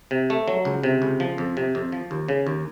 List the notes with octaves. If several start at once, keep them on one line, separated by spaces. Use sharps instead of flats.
C3
A3
F#3
C#2
C3
C#2
F3
F2
C3
F2
F3
D#2
C#3
D#2